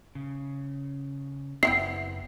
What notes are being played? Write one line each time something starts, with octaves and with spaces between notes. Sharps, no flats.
C#3
F#1 B3 C4 E4 E5 C7